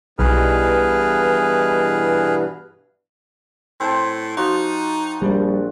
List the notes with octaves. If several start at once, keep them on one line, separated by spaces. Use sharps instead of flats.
B1 G2 B2 E3 G#4 B4 F6
A2 C4 C5 A5
F3 D#4 F#4
A#1 G3